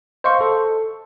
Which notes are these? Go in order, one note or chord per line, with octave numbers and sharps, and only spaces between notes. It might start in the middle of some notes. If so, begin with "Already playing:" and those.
C5 D#5 F5 C6 C#6
A4